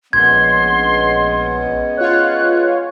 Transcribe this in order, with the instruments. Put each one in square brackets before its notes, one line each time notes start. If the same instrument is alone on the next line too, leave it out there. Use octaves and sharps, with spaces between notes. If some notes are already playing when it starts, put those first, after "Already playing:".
[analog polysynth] A#1 [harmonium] G#3 B3 C#4 [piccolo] C6 [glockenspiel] G#6
[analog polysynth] F4 C#5 [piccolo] F#6